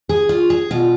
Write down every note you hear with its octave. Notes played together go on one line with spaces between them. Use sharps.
G#4
F4
G#4
B2 F4